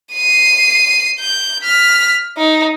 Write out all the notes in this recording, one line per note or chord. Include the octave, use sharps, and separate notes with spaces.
C7 D#7
G6
F6 B6
D#4